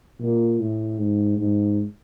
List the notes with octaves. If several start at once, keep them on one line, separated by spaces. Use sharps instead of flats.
A#2
A2
G#2
G#2